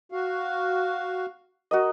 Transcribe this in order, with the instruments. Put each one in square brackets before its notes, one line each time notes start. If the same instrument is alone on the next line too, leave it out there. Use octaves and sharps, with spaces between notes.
[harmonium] F#4 F5
[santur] F#4 A#4 D#5